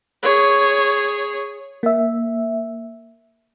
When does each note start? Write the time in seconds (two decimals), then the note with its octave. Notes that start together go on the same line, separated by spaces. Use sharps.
0.23 G#4 C#5
1.83 A#3 E5